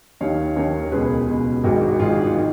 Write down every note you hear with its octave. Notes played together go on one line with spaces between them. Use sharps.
D#2 D#3 C#5 F5
D#2 D#3 A#4 C#5
A#4
C#2 B2 G#4 B4
C#2 B2
G#1 G#2 D#3 F#4 A#4
F#4
G#1 G#2 D#3 F4 G#4
F4
D#3